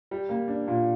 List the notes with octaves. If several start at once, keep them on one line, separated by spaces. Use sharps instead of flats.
G3
A#3
D4
A#2